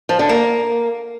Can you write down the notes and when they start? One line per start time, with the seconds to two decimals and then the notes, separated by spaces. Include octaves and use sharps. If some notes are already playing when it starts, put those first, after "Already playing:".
0.09 F3
0.19 D3
0.29 A#3